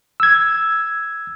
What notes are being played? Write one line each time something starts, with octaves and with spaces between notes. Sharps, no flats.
E6 G#6